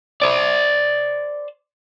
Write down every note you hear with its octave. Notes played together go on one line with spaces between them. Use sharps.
C5 D5